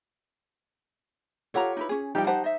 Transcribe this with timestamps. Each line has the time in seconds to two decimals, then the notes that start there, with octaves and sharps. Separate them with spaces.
1.54 F4 G4 A4 C#5 F#5 A#5
1.77 D#4 E4 B4
1.89 C#4 G#4
2.15 F3 G3 D#4 G4 G5
2.27 D#4 G4 C5 F#5 A5
2.44 D#5 E5